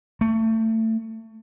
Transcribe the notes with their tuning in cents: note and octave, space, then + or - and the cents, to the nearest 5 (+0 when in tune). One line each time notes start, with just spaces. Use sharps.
A3 +25